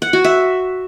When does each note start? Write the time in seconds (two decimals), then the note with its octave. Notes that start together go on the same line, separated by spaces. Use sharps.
0.02 F#5
0.13 F#4
0.24 E5